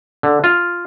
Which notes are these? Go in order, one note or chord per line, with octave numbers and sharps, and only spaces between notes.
D3
F4